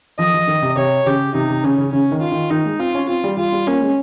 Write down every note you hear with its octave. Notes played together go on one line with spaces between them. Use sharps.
F3 D#5
F3
D#3
C3
C3 C#5
C#3 G4
C3 D#4
C3
C#3 C#4
C#3
C#3 C#4
D#3
F4
D#3
D#3 D#4
G#3
C4 F4
C#4
C4 F4
G3
G3 F4
G3
A#3 C#4
G#3